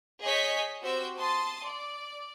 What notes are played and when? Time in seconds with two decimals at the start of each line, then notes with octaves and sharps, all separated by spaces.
0.23 G#4 C#5 D#5 G#5 G6 B6
0.82 C4 F#4 G4 C5 E6 G6
1.17 A5 C6 D#6 A6
1.64 D5